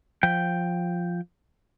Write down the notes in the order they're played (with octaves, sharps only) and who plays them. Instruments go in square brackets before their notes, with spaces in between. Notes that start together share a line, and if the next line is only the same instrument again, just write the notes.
[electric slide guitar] F3 G5